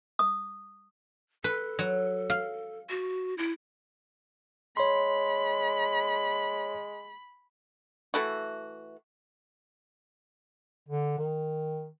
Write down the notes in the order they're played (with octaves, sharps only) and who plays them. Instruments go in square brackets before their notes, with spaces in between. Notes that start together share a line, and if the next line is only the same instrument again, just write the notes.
[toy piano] D#6
[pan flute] A4 [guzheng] B4
[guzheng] F#3
F5
[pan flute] F#4
E4
[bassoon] G#3 [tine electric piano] C#5 C6 [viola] B5
[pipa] E3 A3 F#4
[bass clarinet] D3
D#3